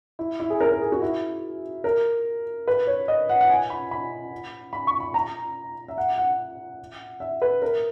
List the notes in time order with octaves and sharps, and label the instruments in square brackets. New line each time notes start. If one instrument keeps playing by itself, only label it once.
[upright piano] E4
E4
G#4
A#4
A#4
G#4
F#4
E4
A#4
B4
C#5
D#5
F#5
F#5
G#5
B5
B5
B5
C#6
B5
A#5
E5
F#5
F#5
E5
B4
A#4